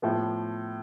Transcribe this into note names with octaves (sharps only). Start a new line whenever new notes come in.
A2 F3 B3